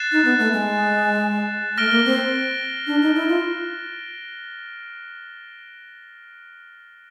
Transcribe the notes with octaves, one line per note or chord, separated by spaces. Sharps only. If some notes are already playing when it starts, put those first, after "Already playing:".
Already playing: F#6 A6 C7 E7
D#4
B3
A3
G#3
A3 F6 A#6 D7 G7
A#3
C4
D4
D#4
E4
F4